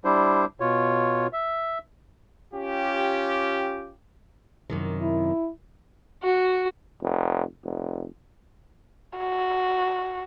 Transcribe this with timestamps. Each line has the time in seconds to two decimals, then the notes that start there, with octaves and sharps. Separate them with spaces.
0.05 G3 D4 E4 C5
0.60 B2 F4 C#5
1.33 E5
2.54 C#4 F4 G4
4.70 F#2 C3 D#3
5.02 E4
6.23 F#4
7.01 F1
7.64 F1
9.18 F#4